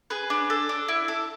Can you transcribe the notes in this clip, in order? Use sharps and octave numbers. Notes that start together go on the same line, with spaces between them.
G#4 B4
D4
A4
D4
E4
A4